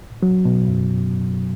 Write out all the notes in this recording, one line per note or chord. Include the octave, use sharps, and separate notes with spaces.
F#3
B2
F#2